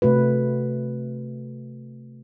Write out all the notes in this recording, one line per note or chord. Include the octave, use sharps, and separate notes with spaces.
C3 A3 F#4 B4